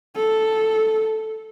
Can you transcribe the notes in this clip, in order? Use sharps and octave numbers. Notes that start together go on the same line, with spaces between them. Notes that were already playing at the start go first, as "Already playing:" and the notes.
A4